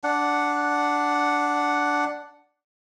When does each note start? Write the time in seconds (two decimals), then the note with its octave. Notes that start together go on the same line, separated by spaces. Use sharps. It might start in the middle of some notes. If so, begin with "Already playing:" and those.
0.04 D4 F#5